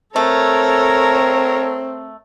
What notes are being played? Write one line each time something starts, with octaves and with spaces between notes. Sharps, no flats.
A3 C4 A4 A#4 C#5